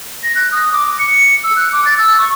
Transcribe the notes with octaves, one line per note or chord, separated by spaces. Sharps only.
A#6
F#6
D#6
D6
C#7
E6
F#6
D6
A6
E6
C#6